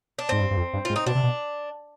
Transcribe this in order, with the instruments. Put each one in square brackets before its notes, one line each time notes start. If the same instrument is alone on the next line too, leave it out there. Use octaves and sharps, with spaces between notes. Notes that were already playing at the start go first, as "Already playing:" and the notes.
[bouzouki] D4
[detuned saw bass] G#2 [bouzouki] C4
[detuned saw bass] G2
G2
F2
G2
[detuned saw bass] G#2 [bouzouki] F4
[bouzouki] D#4
[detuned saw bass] B2 [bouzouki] D4
[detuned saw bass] C3
B2